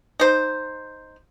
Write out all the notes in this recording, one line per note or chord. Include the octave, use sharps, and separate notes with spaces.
D#4 C5